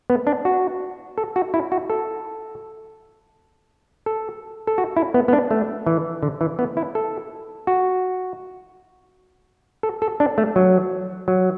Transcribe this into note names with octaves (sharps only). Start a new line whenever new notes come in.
B3
D4
F#4
A4
F#4
E4
F#4
A4
A4
A4
F#4
E4
B3
B3
D4
A3
E3
D3
E3
B3
E4
A4
F#4
A4
A4
D4
A3
F#3
F#3